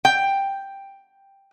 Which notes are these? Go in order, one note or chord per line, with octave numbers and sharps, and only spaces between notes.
G5